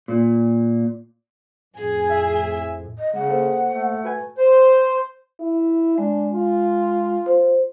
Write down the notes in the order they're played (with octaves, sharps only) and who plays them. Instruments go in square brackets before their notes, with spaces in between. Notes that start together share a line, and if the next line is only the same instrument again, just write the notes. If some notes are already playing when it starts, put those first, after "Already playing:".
[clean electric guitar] A#2
[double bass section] F2 A2 [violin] G#4 G#5
[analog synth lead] E5
[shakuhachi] D#5
[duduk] C#3 [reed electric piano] G#3 [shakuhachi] F#5
[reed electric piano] A#3 A4 C5
[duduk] A3
[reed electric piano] F#4 B4 G#5
[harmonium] C5
[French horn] E4
[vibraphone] G#3 [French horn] D4
[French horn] F4
[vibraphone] C5